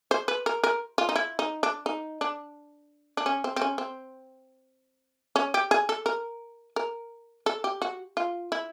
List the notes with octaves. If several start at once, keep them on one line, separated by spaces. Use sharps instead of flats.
C5
B4
A#4
A#4
F4
D#4
E4
D#4
D4
D#4
D4
D4
C#4
C4
C4
C#4
C4
C#4
G4
G#4
A4
A#4
A#4
A4
G4
F#4
F4
E4